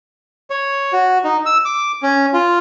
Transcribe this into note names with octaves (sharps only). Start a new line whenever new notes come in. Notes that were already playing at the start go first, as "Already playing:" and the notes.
C#5
F#4
D#4
E6
D6
C#4
F4